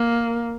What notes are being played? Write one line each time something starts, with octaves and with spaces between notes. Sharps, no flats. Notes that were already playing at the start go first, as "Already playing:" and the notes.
Already playing: A#3